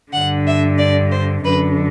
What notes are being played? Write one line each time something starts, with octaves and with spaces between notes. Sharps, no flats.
G2 D3 F#5
E5
D5
C5
F#2 D3 B4